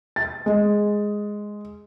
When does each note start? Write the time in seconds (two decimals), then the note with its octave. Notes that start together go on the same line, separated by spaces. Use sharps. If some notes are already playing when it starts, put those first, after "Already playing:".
0.16 A6
0.46 G#3